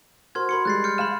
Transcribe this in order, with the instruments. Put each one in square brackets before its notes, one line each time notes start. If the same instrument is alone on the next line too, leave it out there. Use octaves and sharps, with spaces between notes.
[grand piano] F#4 A#4 C5 [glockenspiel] C6 F6 G#6
[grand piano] F#4 A#4 [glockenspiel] B5 C6 C#7
[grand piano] G3 G#3 [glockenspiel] F#6 A6 C7
[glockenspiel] F6 G6 C#7
[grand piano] G#3 F5 E7 [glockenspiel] B5 F6